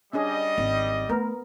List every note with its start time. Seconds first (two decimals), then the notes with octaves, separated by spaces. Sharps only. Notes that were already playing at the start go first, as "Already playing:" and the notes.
0.13 G3 C#4 D4 G#4 D#5
0.58 G#1
1.09 A3 B3 A#4